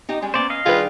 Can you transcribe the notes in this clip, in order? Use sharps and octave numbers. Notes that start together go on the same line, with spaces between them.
D#4 G4 D#5
G3 G#3 C#4
A#3 B3 C#4 C5 D5
D#5 F5
D#3 G3 D4 F4 G#4 B4